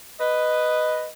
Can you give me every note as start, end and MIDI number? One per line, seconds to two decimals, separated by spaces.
0.20 1.06 71
0.20 1.06 75